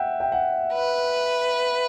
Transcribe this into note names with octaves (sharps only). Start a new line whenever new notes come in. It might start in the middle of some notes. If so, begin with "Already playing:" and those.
Already playing: E5 F#5 G5
G5
F#5
B4